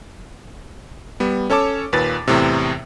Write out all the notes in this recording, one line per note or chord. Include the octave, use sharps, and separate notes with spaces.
G3 B3
C#4 A4 C#5 A5 D6
D#2 A#2 B4 A6
E2 A2 C3